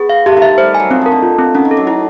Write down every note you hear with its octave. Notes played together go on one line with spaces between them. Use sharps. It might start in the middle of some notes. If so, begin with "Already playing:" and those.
Already playing: B3 G#4
F5
A3 G4
D#3
E5
G3 C5
G#5
F#3
F3 C4
D#3 A#4
D3
F4
C4
D#3 C#4
D#3
A4
F#3
F#3 E4